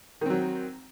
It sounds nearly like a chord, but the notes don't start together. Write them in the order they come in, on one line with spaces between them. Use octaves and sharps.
D#3 C4 F#3